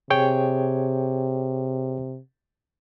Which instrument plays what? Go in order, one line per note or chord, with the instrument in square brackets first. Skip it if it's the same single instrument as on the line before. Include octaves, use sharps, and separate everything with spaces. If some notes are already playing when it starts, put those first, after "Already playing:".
[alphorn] C3 [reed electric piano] G#4 C#5 G5